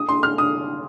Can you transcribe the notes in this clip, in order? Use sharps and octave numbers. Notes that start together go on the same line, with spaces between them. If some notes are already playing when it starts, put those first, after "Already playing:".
Already playing: D#6
C6
F6
D#6